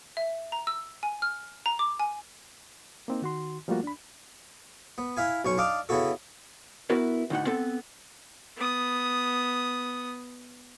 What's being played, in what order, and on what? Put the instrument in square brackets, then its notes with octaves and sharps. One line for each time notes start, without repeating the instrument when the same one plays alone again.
[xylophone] E5
A#5
E6
G#5
F6
A#5
D6
G#5
[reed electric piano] A#3 C4 D#4
D#3 F#4 C6
F3 G3 A3 A#3 F4 F#4
D4 B5
[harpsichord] B3
E4 E5 F5 G#5
B1 C#4 C#6
D4 D#4 F5 A5 D6
C#3 B3 E4 F#4 A4
[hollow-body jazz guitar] B3 E4 F#4 A#4 B4
D2 A2 D#4 F#5
B3 C4 A4
[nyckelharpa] B3 D#6